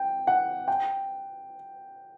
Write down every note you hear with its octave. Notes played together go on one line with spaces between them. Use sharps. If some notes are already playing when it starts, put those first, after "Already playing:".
Already playing: G5
F#5
G5